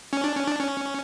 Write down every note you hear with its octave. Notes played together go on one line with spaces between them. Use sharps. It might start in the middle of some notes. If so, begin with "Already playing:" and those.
C#4
D4
C#4
D4
C#4